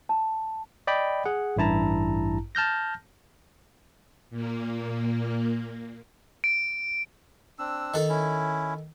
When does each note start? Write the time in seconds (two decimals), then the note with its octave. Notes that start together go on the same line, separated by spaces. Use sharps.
0.09 A5
0.87 D5 D#5 G5 B5
1.25 G#4 F#5
1.57 A1 G2 E4 A5 A#5
2.55 A5 F6 G6 A#6
4.30 A#2 A#3
6.44 D7
7.59 C4 D4 E6
7.94 D#3 A4
8.09 C#4 E4